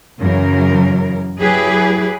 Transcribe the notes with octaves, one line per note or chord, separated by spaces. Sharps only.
F#2 C#3 E3 A#4
F#3 E4 G4 G#4 B4